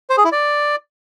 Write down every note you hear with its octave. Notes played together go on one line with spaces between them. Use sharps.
C5
G#4
E4
D5